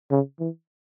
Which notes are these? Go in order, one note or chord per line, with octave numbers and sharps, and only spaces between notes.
C#3
E3